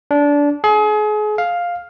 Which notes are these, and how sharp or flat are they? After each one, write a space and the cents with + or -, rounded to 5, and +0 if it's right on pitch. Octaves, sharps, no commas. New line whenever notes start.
D4 -20
G#4 +35
F5 +5